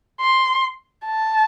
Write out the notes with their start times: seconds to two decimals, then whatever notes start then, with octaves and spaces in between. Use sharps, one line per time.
0.20 C6
1.06 A5